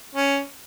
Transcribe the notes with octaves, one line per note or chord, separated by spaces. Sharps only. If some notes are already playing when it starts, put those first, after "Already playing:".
C#4